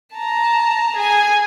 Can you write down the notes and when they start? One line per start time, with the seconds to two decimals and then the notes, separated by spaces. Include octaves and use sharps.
0.15 A5 A#5
0.96 G#4 G#5